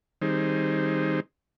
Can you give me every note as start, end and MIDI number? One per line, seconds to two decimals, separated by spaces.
0.22 1.20 51
0.22 1.20 55
0.22 1.20 60
0.22 1.20 63
0.22 1.20 68
0.22 1.20 72